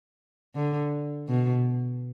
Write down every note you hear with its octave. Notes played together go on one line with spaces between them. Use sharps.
D3
B2